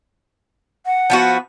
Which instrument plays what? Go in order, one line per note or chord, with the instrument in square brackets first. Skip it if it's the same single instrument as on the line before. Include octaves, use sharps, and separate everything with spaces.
[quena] F#5
[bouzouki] F3 B3 F#4